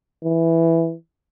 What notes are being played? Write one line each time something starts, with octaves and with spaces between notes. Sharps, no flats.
E3